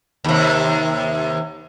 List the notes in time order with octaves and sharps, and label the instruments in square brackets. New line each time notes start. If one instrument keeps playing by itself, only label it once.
[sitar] D#2 C3